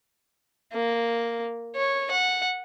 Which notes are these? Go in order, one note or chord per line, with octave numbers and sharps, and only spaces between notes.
A#3
C#5
F#5